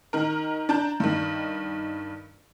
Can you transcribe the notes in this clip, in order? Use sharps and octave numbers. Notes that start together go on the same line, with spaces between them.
D#3 A#4
D4 A5 A#5 G6
G2 D#3